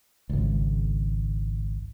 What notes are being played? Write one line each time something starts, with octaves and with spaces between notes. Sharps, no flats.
G#1 C#2